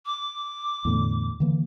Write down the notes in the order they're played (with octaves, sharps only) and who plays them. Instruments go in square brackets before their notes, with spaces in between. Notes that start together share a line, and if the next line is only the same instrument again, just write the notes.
[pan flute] D6
[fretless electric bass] E2 A2 D3
D3 E3 A#3